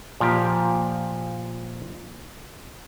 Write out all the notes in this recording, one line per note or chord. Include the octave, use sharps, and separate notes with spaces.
A#2 F3 G4